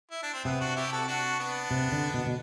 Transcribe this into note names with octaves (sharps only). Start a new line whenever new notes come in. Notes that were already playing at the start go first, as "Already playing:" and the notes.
E4
D4
C4
C3 B3
D4 F#4
E4 G4
F#4 A4
D4 F#4
B3 D4
C3
D3
B2
B2